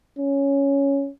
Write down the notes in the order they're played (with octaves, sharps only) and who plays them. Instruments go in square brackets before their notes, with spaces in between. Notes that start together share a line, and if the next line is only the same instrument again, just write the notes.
[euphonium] C#4